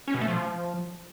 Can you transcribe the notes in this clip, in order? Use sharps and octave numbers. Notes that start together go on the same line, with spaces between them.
C#4
B2
A3
F3